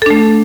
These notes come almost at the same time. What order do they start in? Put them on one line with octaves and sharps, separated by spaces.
A4 D4 A3